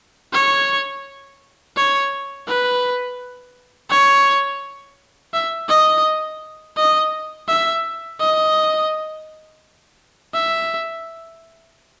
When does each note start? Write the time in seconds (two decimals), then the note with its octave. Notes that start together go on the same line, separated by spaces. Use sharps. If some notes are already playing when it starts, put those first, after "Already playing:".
0.33 C#5
1.77 C#5
2.48 B4
3.90 C#5
5.34 E5
5.69 D#5
6.77 D#5
7.48 E5
8.20 D#5
10.34 E5